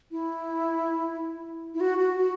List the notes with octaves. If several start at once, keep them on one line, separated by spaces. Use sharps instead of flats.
E4
E4
F#4
F#4
F#4